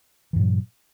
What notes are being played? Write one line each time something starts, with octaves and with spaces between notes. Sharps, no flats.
G2 A#2 E3 F#3